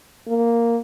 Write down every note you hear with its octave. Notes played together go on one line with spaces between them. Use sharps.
A#3